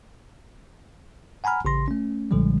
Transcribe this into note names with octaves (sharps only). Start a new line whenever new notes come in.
F#5 G#5 A#5 B5 F6
A1 C#3 C6 A#6
A3 C#4
B1 A#2 D3 F3 G3 G#3